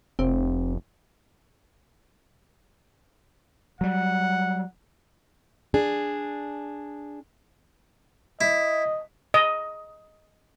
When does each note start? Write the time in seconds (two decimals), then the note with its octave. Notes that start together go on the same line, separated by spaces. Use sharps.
0.19 F1 C4
3.81 F#3 G3 F#5
5.74 D4 G#4
8.41 E4 D#5
9.34 D#5